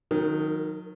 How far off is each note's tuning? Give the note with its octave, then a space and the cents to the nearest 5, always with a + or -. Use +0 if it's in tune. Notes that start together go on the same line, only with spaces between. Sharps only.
D#3 +0 F#3 -30 A#4 -40